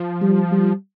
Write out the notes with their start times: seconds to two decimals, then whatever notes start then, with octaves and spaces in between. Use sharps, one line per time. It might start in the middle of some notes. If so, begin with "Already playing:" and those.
Already playing: F3
0.21 G3
0.51 G3